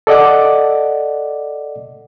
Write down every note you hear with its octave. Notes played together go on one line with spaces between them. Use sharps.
A4 D5 D#5 F#5 D6